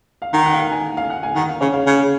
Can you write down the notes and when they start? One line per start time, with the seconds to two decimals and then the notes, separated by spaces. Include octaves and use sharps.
0.22 F5
0.33 D#3 F#5
0.46 F#5
0.54 F5
0.59 F#5
0.72 G#5
0.97 F5
1.10 F#5
1.23 G#5
1.35 D#3 F#5
1.49 F5
1.61 C#3 C#5
1.73 F5
1.86 C#3